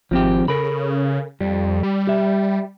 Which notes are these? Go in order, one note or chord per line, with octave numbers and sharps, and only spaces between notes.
G#1 F3 C4 G4
C#3 A4 A#4 B5
F2 G3
G3
G4 E5